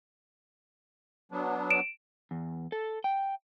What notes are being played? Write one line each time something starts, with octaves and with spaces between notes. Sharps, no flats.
F#3 B3 D4
D7 E7
E2
A4
G5